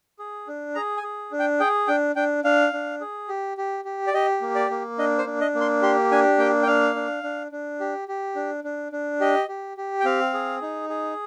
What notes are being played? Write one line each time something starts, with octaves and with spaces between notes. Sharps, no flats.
G#4
D4
G#4 A#5
G#5
G#4
D4
G5
G#4 G5
D4 G5
D4 G5
D4 F5
D4
G#4
G4
G4
G4
D5
G4 D#5
A#3
D5
A#3
D4 D#5
C5
D4
D#5
A#3
C6
G4 C6
D4 G#5
A#3 G5
G5
D4 F5
D4
D4
D4
G4
G4
D4
D4
D4
G4 D#5
G4
G4
G5
C4 F5
G#4
D#4
G#4